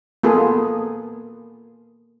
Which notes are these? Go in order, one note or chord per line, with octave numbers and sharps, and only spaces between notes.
A#3 B3 F4 G#4 A4